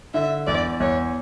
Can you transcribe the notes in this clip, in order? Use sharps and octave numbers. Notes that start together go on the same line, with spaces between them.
D3 E5
E2 D5
E2 C#5